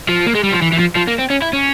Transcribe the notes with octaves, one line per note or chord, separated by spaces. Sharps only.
F3
A#3
G#3
G3
F3
E3
E3
F3
F3
A#3
C4
C#4
E4
C#4